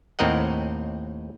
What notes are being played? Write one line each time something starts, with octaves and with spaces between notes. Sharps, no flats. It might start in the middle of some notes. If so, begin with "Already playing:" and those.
D#2 A2 C4 A#4 D#5 F#5